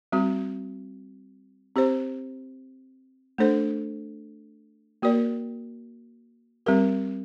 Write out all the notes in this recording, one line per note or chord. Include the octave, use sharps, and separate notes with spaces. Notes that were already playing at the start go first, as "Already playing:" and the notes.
G3 C4 F#4
C4 G4 C5
A3 D4 A4 C5
A#3 F#4 A#4 D5
G3 C4 G4 A#4